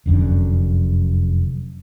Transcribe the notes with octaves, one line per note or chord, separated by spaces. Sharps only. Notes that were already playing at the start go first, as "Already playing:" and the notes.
F1 F#2 D3